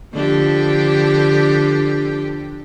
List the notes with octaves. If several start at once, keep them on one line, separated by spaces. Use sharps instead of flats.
D3 F3 G4